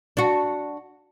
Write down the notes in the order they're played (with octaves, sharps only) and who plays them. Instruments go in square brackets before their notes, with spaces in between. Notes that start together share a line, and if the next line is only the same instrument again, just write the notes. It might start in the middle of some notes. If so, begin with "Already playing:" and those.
[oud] D4 F#4